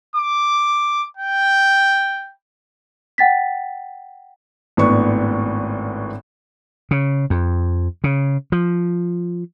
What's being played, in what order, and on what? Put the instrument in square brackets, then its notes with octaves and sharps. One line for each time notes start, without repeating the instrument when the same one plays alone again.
[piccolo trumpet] D6
G5
[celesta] F#5 G5 A6 B6
[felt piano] G#1 A2 B3 D4 C#6
[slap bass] C#3
F2
C#3
F3